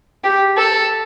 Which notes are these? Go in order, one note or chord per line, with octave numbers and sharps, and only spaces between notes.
G4
A4